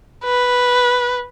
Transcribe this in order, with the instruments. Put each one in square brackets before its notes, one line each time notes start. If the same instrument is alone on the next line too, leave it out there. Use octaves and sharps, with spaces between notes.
[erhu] B4